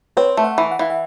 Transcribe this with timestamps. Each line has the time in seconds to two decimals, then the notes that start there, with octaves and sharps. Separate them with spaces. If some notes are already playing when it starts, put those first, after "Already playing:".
0.17 C4 B4 C#5
0.37 A3
0.44 E5 F#5
0.58 E3
0.72 F#5
0.79 E3 F5
0.90 E5 F#5